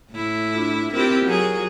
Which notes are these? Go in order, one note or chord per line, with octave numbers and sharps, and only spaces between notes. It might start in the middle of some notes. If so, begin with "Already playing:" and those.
A2 E4
D4 F4
C4 E4 F4 G4 A#4
F#3 G#4